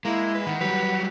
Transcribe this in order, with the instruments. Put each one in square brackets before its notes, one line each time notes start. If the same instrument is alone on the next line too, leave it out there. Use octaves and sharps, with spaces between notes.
[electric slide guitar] G#3 [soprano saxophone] A#3 [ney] E4
[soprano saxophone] B4
[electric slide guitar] D#3 [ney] F#5
[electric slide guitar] F#3 G3 [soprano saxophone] B4